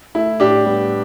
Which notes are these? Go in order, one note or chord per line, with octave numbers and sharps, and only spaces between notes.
A3 E4
A2 D4 G4
G3 B3